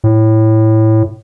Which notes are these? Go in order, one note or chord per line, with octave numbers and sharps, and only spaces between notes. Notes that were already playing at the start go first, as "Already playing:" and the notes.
A2